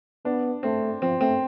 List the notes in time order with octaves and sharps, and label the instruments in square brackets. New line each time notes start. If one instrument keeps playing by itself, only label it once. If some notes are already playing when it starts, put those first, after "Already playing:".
[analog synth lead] B3 [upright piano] D4
[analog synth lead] A3 [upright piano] C4
[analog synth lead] F3 [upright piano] C4
[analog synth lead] A3 [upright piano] C4